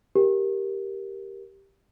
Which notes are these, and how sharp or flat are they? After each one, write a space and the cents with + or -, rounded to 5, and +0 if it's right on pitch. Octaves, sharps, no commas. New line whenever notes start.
G4 +0 A#4 +5